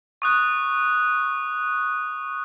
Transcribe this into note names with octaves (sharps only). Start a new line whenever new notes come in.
C#6 D#6 F#6